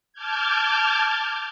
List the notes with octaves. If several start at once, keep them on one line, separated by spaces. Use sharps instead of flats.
A5 D6 F6 G6 G#6